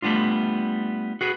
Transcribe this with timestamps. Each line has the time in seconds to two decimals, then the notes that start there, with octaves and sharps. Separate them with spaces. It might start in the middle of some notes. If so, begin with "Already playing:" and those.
0.02 G3 A3 B3 D4 F4
1.21 F#4 G#4 B4